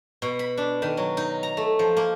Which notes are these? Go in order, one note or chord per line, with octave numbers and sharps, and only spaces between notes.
B2
B5
D4
D#3
F#3
D#4
A#5
A3
F3
A#3